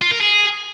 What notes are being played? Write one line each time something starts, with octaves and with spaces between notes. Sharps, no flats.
F4
A#4
G#4